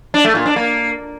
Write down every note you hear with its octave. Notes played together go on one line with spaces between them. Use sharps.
D4
A3
A#2
D4
A#3